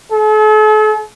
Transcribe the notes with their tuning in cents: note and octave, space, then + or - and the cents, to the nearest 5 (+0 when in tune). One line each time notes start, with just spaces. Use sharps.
A4 -45